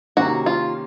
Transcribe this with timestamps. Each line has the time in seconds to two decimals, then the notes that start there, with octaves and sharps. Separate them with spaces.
0.17 C3 D#3 A#3 C#4 F#4
0.46 F4